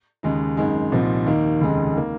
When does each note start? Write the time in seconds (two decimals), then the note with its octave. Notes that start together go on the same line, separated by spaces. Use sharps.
0.23 D#2 C#3 G#3 D#4
0.57 G#1 F#2 D#3 G#3
0.92 C2 A#2 F3 C4 D#4
1.26 D#2 D#3 A#3 D#4
1.61 F1 D#2 C#3 G#3 D#4
1.96 D#3 A#3